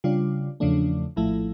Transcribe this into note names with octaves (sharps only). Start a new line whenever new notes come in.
C#3 G3 D4 F4
E2 C#3 F3 A3 D4
A#1 A2 F3 A3 E4